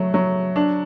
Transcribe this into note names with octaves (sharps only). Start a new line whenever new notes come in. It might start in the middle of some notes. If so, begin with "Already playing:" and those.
Already playing: F#3 A3
F#3
D4